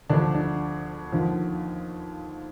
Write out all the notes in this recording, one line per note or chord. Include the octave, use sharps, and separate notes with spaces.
D2 D3 F3 D4
D4
D#2 D3 F3